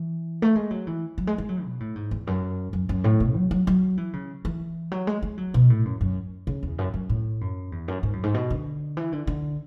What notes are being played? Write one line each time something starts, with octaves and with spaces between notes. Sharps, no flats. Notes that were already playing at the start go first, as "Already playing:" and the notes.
Already playing: E3
A3
G#3
F#3
E3
F#3
G#3
G#3
F#3
B2
A2
G#2
E2
F#2
F#2
F#2
A2
B2
F#3
F#3
F#3
E3
C#3
E3
F#3
G#3
G#3
F#3
B2
A2
F#2
F#2
C#3
E2
F#2
F#2
A2
F#2
E2
F#2
G#2
F#2
G#2
B2
D3
E3
D3
D3